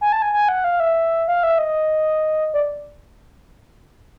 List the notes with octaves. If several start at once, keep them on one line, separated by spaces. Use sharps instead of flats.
G#5
A5
G#5
G#5
F#5
F5
E5
F5
E5
D#5
D5